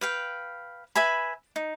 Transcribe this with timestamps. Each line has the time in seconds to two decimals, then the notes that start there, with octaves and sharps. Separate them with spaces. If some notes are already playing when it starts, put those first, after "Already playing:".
0.01 B4 F5 G5
0.96 B4 E5 G#5 B5
1.56 D#4